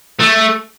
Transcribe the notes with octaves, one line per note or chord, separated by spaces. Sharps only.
A3